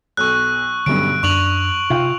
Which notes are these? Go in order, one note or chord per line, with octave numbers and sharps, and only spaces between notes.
B1 C#6 E6 F#6
B1 G2 D3 F#3 C#4 D7
F#2 D4 C#6 F7 F#7
C3 F4 F5 G5